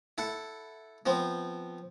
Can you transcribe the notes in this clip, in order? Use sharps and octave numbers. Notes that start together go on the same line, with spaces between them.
E4 A4 F#5
F3 B3 C4